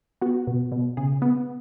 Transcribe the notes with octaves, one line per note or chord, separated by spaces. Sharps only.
B3 F#4
B2
B2
C#3 G#4
B3